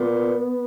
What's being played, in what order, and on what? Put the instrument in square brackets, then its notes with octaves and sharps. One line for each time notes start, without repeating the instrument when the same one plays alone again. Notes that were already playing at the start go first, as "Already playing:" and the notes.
Already playing: [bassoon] A#2 [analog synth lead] B3